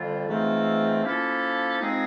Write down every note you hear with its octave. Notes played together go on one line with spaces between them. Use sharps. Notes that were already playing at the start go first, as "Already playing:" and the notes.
Already playing: F2 D3 G3 F4
G#2 E3 A3 C4 F4
F3 A#3 C#4 E4 A4
F3 G#3 C4 D#4 G#4